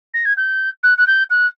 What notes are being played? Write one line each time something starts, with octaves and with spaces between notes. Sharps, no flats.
A#6
G#6
G6
F#6
F#6
G6
F#6